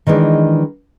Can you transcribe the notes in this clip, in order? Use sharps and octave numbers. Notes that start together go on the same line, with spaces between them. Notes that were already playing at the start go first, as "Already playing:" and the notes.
D#3 E3 G#3 D4